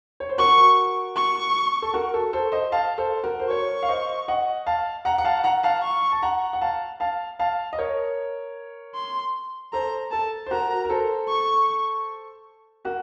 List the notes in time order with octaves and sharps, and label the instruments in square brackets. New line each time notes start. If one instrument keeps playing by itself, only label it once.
[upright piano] C#5
C5
[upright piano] F#4 A#4 [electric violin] C#6
[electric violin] C#6
[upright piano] A4
F#4 A#4
A4
A4 C5
C5 D#5
F5 A5
A4 C5
F#4 A#4
C5
[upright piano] A#4 C#5 [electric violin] C#6
[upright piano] F5
C5 D#5
D#5 F#5
F5 A5
F#5 A#5
F#5
F5 A5
F#5 A#5
F5 A5
[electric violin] C#6
[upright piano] A5
F#5 A#5
F#5
F5 A5
F5 A5
F5 A5
D#5
A#4 C#5
[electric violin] C6
[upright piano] A4 C5 [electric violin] A#5
[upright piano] A4 [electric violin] A5
[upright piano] C5
[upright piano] F#4 A#4 [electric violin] A#5
[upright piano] A#4
A4 C5
[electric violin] C#6
[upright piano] F#4 A#4